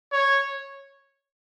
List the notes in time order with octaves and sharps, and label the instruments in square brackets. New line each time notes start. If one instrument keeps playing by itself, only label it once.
[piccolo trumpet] C#5